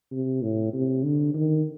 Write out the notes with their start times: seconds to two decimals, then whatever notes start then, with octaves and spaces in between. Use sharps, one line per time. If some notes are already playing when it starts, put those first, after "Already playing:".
0.11 C3
0.42 A2
0.73 C3
1.03 D3
1.34 D#3